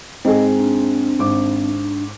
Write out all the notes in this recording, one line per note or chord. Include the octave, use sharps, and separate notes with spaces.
G#2 C4 G#4 D#5
D4
G#1 D6